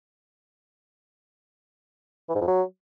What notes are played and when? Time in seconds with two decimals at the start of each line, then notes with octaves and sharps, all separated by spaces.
2.29 E3
2.35 G#2
2.41 F2
2.48 F#3